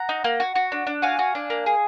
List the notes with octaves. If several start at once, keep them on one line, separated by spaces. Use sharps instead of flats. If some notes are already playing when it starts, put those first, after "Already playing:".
Already playing: F#5 A#5
D#4
A#3
F#4
F#4
D4
D4
F#4 F5 G#5
F#4
D4
A#3
G#4